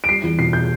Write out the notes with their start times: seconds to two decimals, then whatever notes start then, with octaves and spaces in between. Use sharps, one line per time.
0.04 D7
0.08 G3 C7
0.23 E2
0.39 B2 C7
0.53 G6